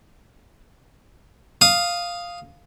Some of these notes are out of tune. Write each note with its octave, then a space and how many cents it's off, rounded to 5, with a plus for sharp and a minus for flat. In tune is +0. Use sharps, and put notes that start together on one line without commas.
F5 +0 D#6 +0